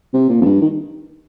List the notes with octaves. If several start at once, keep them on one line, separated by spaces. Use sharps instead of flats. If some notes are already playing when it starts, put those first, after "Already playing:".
C3
A#2
F2
G2
D#3